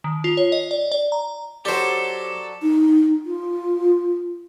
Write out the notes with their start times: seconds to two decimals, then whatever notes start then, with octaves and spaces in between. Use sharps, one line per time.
0.04 D#3
0.24 F4
0.37 C#5
0.52 D#5
0.71 D5
0.92 D5
1.12 A#5
1.65 F#3 G4 A4 C5 D5
2.62 D#4
3.26 F4